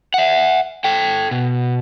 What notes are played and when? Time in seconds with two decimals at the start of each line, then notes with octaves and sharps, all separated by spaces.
0.14 E5 F#5
0.84 A4 G5
1.31 B2